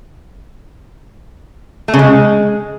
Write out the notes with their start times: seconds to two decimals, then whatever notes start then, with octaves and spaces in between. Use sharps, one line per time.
1.88 A3
1.94 C#3
1.99 G#3